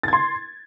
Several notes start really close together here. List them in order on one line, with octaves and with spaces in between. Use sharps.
A6 G#6 C6